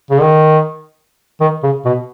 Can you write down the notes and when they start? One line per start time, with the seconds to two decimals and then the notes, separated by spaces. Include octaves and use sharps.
0.11 C#3
0.23 D#3
1.41 D#3
1.63 C#3
1.85 B2